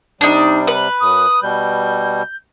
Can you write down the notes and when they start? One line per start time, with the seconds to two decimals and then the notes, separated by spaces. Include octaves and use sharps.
0.21 C3 G3 D4 D#4
0.67 B4
1.00 F#2 D#6
1.42 B2 G3 G6